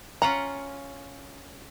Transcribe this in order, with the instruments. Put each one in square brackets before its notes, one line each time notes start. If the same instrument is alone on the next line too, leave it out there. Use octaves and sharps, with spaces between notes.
[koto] C#4 F4 F#5 [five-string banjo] A#5